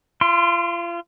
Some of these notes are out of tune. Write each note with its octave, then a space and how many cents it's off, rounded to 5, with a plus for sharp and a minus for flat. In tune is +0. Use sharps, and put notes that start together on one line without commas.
F4 -35 C6 +0